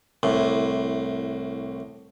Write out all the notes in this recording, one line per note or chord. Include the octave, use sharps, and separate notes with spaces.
C2 A2